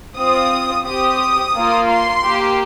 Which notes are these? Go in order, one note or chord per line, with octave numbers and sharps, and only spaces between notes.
C4 F4 D#6
C4 G4 D#6
A#3 F4
C6
A#3 G4